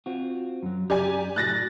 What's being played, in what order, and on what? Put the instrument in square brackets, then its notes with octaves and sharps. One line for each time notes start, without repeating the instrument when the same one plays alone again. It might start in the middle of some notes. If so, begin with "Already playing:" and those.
[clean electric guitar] C4 F4 F#4
F#2 F#3
[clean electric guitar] F#2 A#5 [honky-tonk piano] G4 D5 G#5
[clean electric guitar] A2 F#4 [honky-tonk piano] F#6 A6 A#6